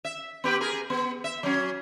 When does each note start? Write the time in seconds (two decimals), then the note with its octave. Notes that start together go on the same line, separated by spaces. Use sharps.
0.05 E5
0.44 B3 G4 B4
0.61 G#4 A#4
0.90 B3
1.24 E5
1.43 F#3 C#4